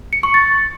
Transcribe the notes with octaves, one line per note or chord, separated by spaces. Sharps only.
C#7
C#6
A6